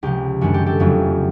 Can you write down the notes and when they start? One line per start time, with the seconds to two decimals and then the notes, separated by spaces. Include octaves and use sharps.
0.03 C#2 C3 F3 G4
0.41 F#2 D#3 G#3 B3 D4 F#4
0.54 G4
0.66 G4 A4
0.79 F1 F2 C#3 F#3 A3